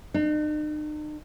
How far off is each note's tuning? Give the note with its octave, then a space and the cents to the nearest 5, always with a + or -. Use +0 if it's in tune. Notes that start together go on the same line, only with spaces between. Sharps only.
D#4 -45